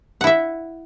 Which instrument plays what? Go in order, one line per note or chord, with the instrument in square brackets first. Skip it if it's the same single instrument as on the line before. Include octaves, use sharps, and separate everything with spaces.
[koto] F#5
E4
E5